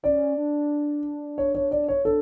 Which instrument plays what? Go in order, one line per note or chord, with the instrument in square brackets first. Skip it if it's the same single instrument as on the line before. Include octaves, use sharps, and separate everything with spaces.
[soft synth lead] C#4 [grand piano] D5
[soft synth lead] D4
[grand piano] C#5
C#5
D5
C#5
[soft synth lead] D4 [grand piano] A4